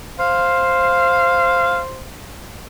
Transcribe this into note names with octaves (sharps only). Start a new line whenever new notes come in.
C5 F5